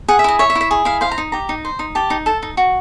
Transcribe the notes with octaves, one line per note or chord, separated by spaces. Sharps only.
G#4 F#5
E5
E4 D#5
C#5 E5
E5
E4
E5
G#4
E4 F5
C5 F5
A#5
D#4
G4 A#5
D#4
C5
D#4
G4 A5
D#4
A4 A5
D#4
F#4